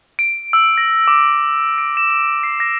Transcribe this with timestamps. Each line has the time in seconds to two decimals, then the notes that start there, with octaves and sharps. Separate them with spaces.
0.19 D7
0.53 E6
0.78 A#6
1.08 D6
1.78 D7
1.97 E7
2.10 E7
2.43 C7
2.60 A#6